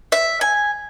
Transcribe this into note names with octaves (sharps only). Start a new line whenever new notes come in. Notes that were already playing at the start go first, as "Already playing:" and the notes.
E5
G#5